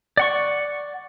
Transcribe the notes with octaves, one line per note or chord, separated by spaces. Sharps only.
D5 F#5 C#6